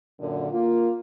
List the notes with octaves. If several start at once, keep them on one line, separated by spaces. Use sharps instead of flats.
F#2 A#2 D3
A#3 F4